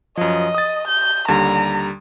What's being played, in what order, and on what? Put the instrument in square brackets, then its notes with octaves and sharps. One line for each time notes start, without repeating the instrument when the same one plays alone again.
[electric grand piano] F#2 F3 [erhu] D#5
[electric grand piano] D#6 A6
[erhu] G6
[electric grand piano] D#2 D3 G3 [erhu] A#5